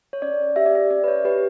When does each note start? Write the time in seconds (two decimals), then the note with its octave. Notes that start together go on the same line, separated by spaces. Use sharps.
0.13 C#5
0.22 C#4 D5
0.56 G4 E5
0.66 D5
0.75 E5
0.90 C#4 D5
1.04 B4
1.08 C#5
1.25 G4 B4